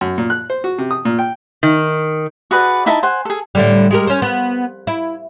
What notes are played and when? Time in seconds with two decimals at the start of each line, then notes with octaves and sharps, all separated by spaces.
0.01 F#2
0.18 A#2
0.30 F#6
0.50 C5
0.64 F#4
0.78 C3
0.91 D#6
1.05 A#2
1.19 G5
1.63 D#3
2.51 F#4 G#4 B4 D5
2.86 D#4 E4 E5 A5
3.03 C5 F#5 G#5
3.25 G#4 A4
3.55 A2 D3 G3
3.91 G#3 G4 A#4
4.07 C#4 C5
4.22 B3
4.87 E4